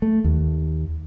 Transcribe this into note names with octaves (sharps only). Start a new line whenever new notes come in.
A3
D#2